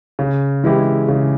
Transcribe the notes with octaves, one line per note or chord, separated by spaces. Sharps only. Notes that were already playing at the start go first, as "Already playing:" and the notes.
C#3
E3 G#3 E4 G4
C#3